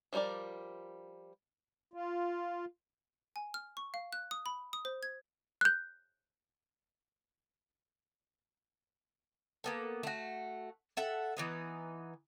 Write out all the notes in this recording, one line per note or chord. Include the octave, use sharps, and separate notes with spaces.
F3 G3 C4 A#4 D5
F4
G#5
F6
C#6
F5
F#6
D#6
B5
D#6
C5
G#6
F#6 G6
A#3 B3 A4
A3 F#4
A4 E5 F#5
E3 B3 D#4